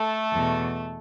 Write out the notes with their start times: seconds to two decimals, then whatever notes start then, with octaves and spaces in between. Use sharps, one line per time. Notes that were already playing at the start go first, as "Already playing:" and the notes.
Already playing: A3 A4
0.32 E2
0.37 B2